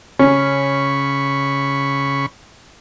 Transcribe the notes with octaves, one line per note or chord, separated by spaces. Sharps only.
C#3 C#4 B5 C#6